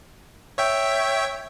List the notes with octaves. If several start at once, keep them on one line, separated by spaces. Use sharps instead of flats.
C#5 E5 G5